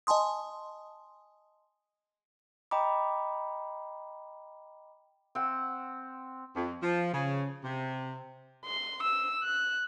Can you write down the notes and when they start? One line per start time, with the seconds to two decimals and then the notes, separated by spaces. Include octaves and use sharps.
0.07 D#5 G#5 A5 C6 D#6
2.71 D#5 G5 A#5 B5 D6
5.35 C4 F#5
6.56 F2
6.83 F3
7.13 C#3
7.64 C3
8.65 C6
9.03 E6
9.43 F#6